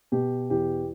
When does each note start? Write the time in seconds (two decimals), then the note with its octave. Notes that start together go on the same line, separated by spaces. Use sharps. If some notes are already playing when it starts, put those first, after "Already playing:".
0.12 B2 G4
0.50 E2 G4